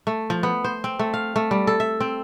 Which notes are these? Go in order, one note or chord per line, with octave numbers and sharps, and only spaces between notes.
A3
F3
B3
C5
C4
A3
F5
A3
G3
A4
E5
C4